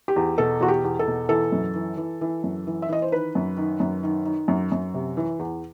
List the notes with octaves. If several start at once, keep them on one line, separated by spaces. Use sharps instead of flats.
G4
E2
B2 A4
E2 F#4
G4
E2
A4
B2
E3 A4
F#2
E3
E3
E3
F#2
E3
E5
E3 D#5
C5
D#3 B4
F#2
D#3
F#2
D#3
D#3
F#2
F#2
C3
E3
E2